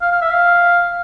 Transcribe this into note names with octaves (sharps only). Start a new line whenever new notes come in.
F5
F5
E5
F5